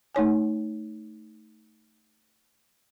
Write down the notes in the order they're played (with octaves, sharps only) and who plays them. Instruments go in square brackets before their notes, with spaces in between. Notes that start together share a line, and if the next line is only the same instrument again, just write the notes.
[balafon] A3 D#4 C#5 G#5